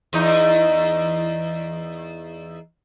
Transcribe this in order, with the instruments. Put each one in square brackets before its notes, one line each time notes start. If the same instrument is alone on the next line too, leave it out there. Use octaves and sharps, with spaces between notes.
[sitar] E2 D#4